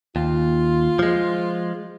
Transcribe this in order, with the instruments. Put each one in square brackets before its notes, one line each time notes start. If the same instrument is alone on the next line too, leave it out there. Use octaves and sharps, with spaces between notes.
[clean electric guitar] D#2 [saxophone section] F4
[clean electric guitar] F3 G#3